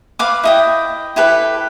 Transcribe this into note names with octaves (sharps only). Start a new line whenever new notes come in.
B4 F5 D6
E4 D#5 G5
E4 G4 A4 B4